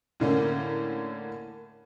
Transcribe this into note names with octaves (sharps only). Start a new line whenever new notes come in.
A2 D3 A#3 C#4